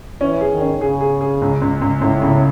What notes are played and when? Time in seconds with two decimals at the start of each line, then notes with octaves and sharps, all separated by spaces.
0.21 E3 C#4
0.41 G#4
0.51 D#3
0.61 C#4
0.81 C#3 G#4
1.01 G#4
1.21 G#4
1.42 C#2
1.61 C#2
1.81 C#2
2.01 C#2 A2
2.22 C#3